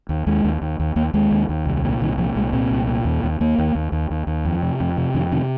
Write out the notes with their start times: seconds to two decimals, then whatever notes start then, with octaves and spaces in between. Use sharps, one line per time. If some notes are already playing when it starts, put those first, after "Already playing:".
0.09 D#2
0.27 D#2 G#3
0.44 D#2
0.61 D#2
0.80 D#2
0.96 D#2 A#3
1.14 D#2 G#3
1.31 D#2
1.49 D#2
1.66 C2
1.84 A#2
2.01 C2 D#3
2.18 A#2 F3
2.36 C2 G#3
2.53 A#2 C4
2.71 C2
2.88 A#2
3.05 D#2
3.23 D#2
3.40 D#2 A#3
3.58 D#2
3.75 D#2
3.92 D#2
4.10 D#2
4.27 D#2
4.45 F2
4.62 C3
4.80 F2
4.97 C3
5.14 F2 D#3
5.32 C3 D#3